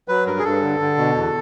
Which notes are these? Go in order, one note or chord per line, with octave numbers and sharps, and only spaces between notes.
F#3 B4
G2 A#4
G#4
G2 A4
D3
D3
B2
E2